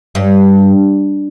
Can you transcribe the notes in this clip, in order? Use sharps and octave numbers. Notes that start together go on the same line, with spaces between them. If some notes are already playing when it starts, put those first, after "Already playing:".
G2